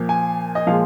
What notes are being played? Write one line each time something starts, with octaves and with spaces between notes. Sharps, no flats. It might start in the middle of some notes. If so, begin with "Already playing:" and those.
Already playing: A#2 F3 A#3
G#5
D#5
A#2 F3 G#3 F5